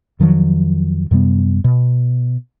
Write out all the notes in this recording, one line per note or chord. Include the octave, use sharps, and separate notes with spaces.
F2 D#3 F3 F#3
F#2 C3 G3 B3
B2